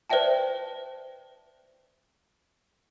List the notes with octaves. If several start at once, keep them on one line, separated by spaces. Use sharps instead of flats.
B4 C5 D5 E5 G5 A5